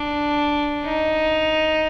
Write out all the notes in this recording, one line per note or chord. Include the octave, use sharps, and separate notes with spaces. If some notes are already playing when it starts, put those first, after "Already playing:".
Already playing: D4
D#4